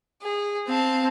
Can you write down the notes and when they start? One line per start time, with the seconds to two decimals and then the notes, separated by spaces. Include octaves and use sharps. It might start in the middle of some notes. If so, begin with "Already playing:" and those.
0.21 G#4
0.68 C4 F5 A5